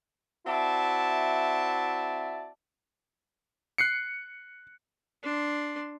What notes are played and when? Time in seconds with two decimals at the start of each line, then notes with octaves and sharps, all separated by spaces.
0.46 C4 E4 F#4 D5 E5 A5
3.78 F#6 C7 C#7
5.23 D4 C6